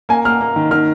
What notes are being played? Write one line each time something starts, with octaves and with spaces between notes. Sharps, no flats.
A#3 G#5
A#3 F6
A#3
D#3
D#3 F6